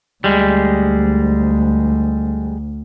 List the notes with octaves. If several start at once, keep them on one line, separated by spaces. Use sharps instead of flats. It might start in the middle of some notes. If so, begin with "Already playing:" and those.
D2 G3 G#3